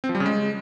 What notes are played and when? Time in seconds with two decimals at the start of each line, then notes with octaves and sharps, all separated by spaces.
0.04 C4
0.09 F3
0.15 G3
0.20 C#3
0.26 G#3